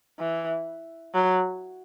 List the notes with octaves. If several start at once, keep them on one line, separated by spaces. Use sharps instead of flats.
E3
F#3